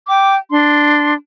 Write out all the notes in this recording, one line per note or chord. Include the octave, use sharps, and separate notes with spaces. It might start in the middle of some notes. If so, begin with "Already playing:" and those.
G5 D6
D4 C6